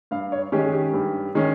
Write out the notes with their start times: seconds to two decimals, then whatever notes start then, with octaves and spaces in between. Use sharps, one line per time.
0.11 G2 F5
0.32 C#5
0.52 D#3 G#3 C#4 G4
0.66 G#4
0.73 G4
0.93 G2
1.35 D#3 G#3 C#4